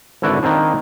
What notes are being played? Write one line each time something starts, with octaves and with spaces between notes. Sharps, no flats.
G#1 D3 E4 F#4 B4 D5
D#3 A#3 C4 D4